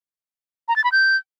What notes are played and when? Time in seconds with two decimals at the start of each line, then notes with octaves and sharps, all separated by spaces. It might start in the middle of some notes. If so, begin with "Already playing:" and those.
0.68 A#5
0.76 A6
0.84 B5
0.92 G6